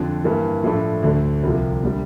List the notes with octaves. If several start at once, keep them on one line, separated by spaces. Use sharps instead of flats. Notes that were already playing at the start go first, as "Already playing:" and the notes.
Already playing: F2 D3
G2 E3 A#3
A2 F3 A3 D4 A4
D2 D3 A3
C2 C3 F3
D3 G3